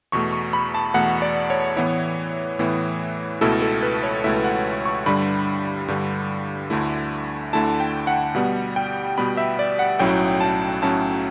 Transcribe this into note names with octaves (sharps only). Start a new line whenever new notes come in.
E2 B2 A3 C#6
C#6
B5
A5
E2 B2 A3 F#5
D5
C#5
A2 E3 B3 E4 C#5
A2 E3 B3 E4
C#2 B2 A3 E4 A4
A4
B4
C#5
C#2 B2 A3 E4 E5
F#5
C#6
G2 D3 G3 B5
G2 D3 G3
D2 D3 A3 E4
D2 D3 A3 E4 A5
G5
F#5
B2 G3 B3 F#5
G5
B2 G3 B3 B5
E5
D5
F#5
B1 A2 F#3 C#4 E4 G5
A5
B1 A2 F#3 C#4 E4 A5